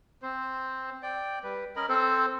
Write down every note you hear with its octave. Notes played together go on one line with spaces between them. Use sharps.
C4 C5
D5 G5
G3 B4
C#4 A#4 D#5 B5
C4 A4 C5